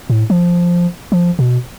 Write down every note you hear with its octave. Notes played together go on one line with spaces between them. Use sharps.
A2
F3
F3
B2